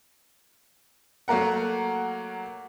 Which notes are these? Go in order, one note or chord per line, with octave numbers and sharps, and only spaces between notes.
F#3 A3 A#3 A#4 F#5